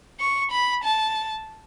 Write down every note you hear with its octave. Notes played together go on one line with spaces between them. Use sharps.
C#6
B5
A5